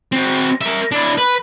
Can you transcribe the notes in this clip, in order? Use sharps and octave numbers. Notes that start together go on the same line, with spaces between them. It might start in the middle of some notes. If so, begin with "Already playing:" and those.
C4 F#4
A#4 E5
D4 E4
B4